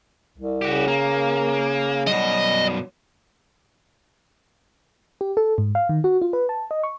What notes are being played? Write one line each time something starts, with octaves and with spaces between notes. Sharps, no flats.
C2
C#3 F#4 G4
A#3 A#4
F#2 B2 G3 D#5
G4
A4
G#2
F5
D#3
F#4
F4
B4
A5
D#5
C#6